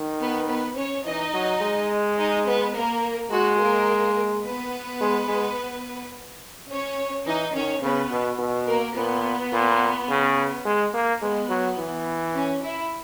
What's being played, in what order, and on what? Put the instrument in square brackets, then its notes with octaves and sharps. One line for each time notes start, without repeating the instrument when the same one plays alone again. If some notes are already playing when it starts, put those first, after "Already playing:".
Already playing: [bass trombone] D#3
[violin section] B3 B4
B3 B4
C#4 C#5
[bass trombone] E3 [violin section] D#4 D#5
[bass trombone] F#3
G#3
[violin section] D#4 D#5
B3 B4
A#3 A#4
[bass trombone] G#3 [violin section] F#4
[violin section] A#3 A#4
B3 B4
[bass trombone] G#3
G#3
[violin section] C#4 C#5
[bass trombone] E3 [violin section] D#4 D#5
[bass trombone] D#3 [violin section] C#4 C#5
[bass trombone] C#3 [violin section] B3 B4
[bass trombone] B2
B2
[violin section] A#3 A#4
[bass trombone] A#2 [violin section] B3
[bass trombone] A#2
C#3
G#3
A#3
[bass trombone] G#3 [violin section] B3
[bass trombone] F#3
E3
[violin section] C#4
E4